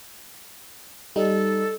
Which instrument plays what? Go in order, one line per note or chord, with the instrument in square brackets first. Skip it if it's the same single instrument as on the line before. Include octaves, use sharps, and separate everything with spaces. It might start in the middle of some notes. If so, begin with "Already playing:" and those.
[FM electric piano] G3 D#4 [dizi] A4